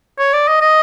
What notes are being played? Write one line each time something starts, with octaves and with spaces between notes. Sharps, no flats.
C#5
D5
D#5
D#5